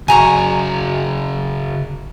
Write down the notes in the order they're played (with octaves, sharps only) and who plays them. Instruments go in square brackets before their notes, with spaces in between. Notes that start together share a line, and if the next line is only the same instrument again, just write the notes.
[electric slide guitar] C#3 F#4 G#4 [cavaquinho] G#5 A#5 C#6